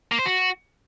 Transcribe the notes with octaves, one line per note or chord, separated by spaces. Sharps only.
A#3
C5
F#4